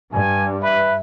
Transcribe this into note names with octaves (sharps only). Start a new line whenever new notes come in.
G2 G#5
B4 E5